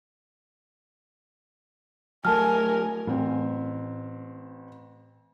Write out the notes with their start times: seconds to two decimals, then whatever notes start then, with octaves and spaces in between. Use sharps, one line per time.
2.25 F#3 A3 A#4 G#5 A5 F6
3.07 A1 A2 C4